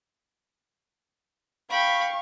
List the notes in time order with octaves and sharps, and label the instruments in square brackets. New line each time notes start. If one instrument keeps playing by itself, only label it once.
[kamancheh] F5 C#6 [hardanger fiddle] G5 B5